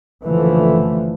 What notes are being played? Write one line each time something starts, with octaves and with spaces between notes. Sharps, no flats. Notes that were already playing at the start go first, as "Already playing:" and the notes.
F#1 D3 E3 F3 A3